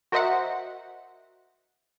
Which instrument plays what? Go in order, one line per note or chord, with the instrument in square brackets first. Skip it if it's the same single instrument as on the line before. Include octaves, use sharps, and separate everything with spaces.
[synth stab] F#4 A#4 C5 D#5 E5 F#5